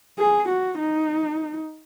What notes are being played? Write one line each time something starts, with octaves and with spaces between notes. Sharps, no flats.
G#4
F#4
D#4